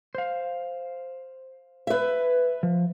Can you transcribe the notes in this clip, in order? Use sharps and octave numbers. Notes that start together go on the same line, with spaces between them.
C5 F5
B4 E5
F3